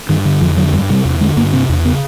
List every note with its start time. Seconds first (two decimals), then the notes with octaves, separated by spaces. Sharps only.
0.09 G2 D#3
0.25 D3
0.41 F2 F3
0.57 D3 F#3
0.73 G2 G3
0.90 C3 G3
1.05 E2
1.21 D3 G#3
1.37 G2 A#3
1.53 C3 C4
1.69 E2
1.85 C#3 B3